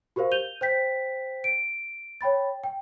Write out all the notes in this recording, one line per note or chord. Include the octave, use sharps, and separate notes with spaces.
F#4 G4 A#4 C5 F5
G6 D#7 F7 G7
C5 G5 G6 B6
D7
C#5 G5 B5 A6
G5